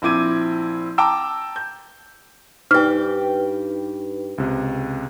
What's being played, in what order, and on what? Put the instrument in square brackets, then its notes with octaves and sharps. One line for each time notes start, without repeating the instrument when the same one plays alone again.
[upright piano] A#1 C4 E4 D6 G#6 D#7
G5 A5 A#5 D6 E6
G6
[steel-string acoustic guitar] G2 G4 [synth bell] D#4 B4 [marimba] F6
[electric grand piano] C#2 C3